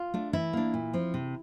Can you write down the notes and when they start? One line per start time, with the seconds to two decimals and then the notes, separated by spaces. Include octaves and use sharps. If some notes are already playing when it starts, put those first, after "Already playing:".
Already playing: F4
0.14 A3 D4
0.33 E3 E4
0.53 A#3 D4
0.74 A#2
0.93 F3 C4
1.14 C3